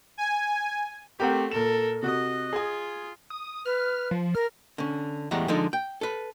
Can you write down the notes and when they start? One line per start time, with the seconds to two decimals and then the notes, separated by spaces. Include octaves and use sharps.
0.18 G#5
1.20 A3 C4 G4 A#4 F#5
1.52 A#2 A4 A#4 E7
2.03 C3 F#4 D#5
2.53 F4 G#4 G#5
3.30 D#6
3.66 B4 F6
4.11 F3
4.35 A#4 F6
4.78 D3 C#4
5.31 E2 A2 G3 G#3 F#5 A#5
5.48 D3 F3 G#3 D#4 A4
5.73 G5
6.01 A4 B4